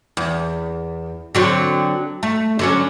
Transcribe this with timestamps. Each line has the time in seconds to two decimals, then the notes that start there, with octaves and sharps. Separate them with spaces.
0.17 E2
1.35 D3 F#3 C4
2.23 A3
2.59 D3 F#3 C#4